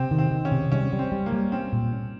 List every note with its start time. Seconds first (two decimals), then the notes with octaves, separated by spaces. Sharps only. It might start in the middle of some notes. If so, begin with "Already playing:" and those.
Already playing: C3 C4
0.11 D#3
0.18 C4
0.31 D#3
0.45 C#4
0.52 C3
0.72 G3 C#4
0.93 G3
0.99 C4
1.12 G3
1.26 A#3
1.32 G3
1.52 C4 C#4
1.72 A#2
1.93 C#4